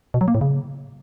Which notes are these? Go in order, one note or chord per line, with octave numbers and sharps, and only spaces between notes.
B2
F#3
A#3
A2
C#3